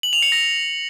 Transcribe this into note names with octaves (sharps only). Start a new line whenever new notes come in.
F#7
F7
C#7
A#6